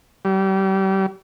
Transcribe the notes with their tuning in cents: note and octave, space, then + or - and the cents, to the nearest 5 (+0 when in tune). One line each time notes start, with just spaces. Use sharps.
G3 -30